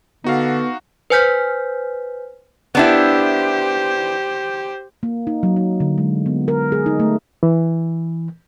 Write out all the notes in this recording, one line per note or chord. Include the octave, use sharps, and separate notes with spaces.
D3 B3 D#4 F#4 F5
B4 C5 G#5 F6 G6 B6
B3 D4 E4 G4 C5
A#3
D#4
F#3
D#4
D3
G#3
B3
A#4
G#4
D#4
A3
E3